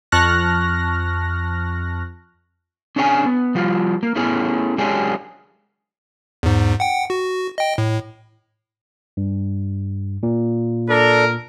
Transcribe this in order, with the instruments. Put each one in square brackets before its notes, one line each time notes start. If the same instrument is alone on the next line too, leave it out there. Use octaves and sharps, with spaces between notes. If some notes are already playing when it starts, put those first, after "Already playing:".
[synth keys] F2 A5 C#6 F6 F#6 A#6
[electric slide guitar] C#4 D4 G#4 C#5 F#5 G#5
B3
F3 G3 F4
A#3
A3 B3 C#4 E4 G#4
F#3 G#3 C#4 D4 G4 G#4
[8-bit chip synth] E2 G#2
F#5 G5
F#4
D#5 G5
A2
[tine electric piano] G2
A#2
[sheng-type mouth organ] D4 A4 D5 [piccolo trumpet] A#4